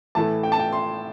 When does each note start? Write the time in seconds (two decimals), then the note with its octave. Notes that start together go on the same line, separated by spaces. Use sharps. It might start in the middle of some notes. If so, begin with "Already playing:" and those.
0.15 A2 E3 A3 A5
0.43 G5
0.52 A5
0.59 G5
0.72 C6